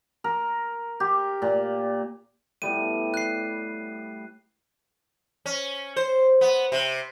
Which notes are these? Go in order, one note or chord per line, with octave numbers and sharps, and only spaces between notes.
A#4
G4
A#2
A2 G3 B3 D#7
F#6 C7
C#4
C5
B3
C3